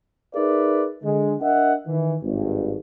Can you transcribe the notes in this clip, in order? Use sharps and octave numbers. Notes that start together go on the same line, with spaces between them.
D#4 G#4 A#4 B4 D5 E5
D3 G#3
D4 A#4 D#5 E5 F#5
D#3 E3
G#1 G2